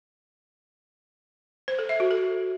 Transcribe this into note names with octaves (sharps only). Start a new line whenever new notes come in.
C5
A4
E5
F#4
A4